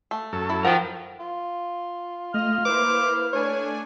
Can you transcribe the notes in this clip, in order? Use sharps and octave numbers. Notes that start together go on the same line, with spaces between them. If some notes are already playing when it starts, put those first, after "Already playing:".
A3
F#2 A4
E4
F3 A#4 F#5 G5
F4
A3 D#5 F6
A#3 E4 B4 C5 D6
A3 D4 C#5 G#5